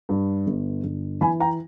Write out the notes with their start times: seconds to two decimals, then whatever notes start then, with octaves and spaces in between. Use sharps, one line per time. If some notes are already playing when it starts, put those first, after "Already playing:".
0.09 G2
0.47 G1
0.84 G1
1.21 E3 G#5 B5
1.40 G5 A#5